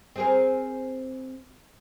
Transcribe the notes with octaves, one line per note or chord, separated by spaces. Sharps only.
C4 G#4 A#4